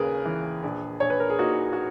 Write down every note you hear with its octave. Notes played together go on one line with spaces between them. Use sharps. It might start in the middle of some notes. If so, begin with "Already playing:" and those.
Already playing: D#2 C#3 G#4 A#4 B4
E3
A#1
A#1 C#5
B4
A#4
G#4
A#2 D#4 F#4
F#4